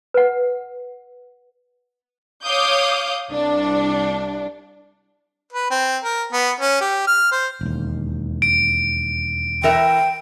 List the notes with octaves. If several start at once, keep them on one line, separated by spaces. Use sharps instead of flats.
B4 F#5
C#5 F5 D6 D#6 G6
C2 D4
B4
C4
A#4
B3
C#4
G4
F6
C5
E1 D#2
D7
E3 A#4 E5 G5